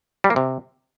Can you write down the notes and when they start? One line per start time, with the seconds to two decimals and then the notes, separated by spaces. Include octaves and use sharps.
0.24 G3
0.30 A#3
0.36 C3